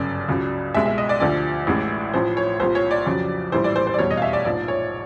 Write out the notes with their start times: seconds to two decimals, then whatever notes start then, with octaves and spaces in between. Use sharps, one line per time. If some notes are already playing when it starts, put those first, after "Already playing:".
Already playing: G1 F#2 C#3 D5
0.28 C#2 C#3 F#3
0.74 C2 B2 G#3 E5
0.86 E5
0.98 D#5
1.09 D5
1.20 D2 D3 F3 A3 D5
1.67 A1 A2 E3 G#3
2.14 A1 A2 F3 C5
2.37 C#5
2.60 C2 A#2 F3 C5
2.75 C#5
2.91 D5
3.06 F2 C#3 F#3
3.52 A#1 A2 E3 G3 C5
3.64 D5
3.76 C5
3.87 C5
3.94 D5
3.98 F1 E2 B2 G3 C#5
4.11 D#5
4.17 F5
4.22 E5
4.33 D5
4.45 A#1 G#2 F3 D5
4.68 C#5